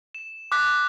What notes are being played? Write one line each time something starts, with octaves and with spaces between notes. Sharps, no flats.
E7
D6 F#6 B6